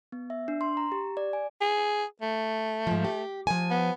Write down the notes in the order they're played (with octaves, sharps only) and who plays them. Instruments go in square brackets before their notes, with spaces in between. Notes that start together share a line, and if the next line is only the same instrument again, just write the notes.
[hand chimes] B3
E5
D4
C6
A#5
G4
D5
G#5
[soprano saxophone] G#4
A3
[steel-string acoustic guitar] G#2 F3
G4
F3 G#5
[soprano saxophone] B3